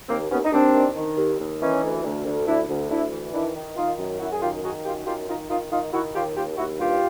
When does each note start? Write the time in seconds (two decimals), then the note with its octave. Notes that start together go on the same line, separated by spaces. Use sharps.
0.09 D#2 A#3 C4
0.30 D#2 B3 C#4
0.44 D#4
0.52 D#2 C4 D4
0.74 D#3
0.95 D#3
1.17 D#2
1.39 D#2
1.61 E3 C#4 D#4
1.82 D2
2.03 D2
2.25 D2
2.46 D2 D4 E4
2.69 D2
2.90 D2 D4 E4
3.12 E3
3.33 D#3 D4 E4
3.55 D#3
3.76 D#3 D#4 F4
3.98 F#2
4.20 F#2 E4 F#4
4.32 G#4
4.41 D#3 F4 G4
4.63 D#3 F#4 G#4
4.84 F#2 F4 G4
5.06 D#3 F4 G4
5.27 D#3 D#4 F4
5.50 D#3 D#4 F4
5.71 D#3 D#4 F4
5.93 D#3 E4 F#4
6.14 D#2 F4 G4
6.36 D#2 F4 G4
6.57 D#2 E4 F#4
6.79 G2 F4 G4